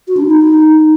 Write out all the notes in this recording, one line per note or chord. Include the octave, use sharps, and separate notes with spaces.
F#4
D4
D#4